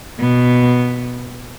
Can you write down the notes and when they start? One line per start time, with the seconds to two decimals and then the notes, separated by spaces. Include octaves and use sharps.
0.20 B2 B3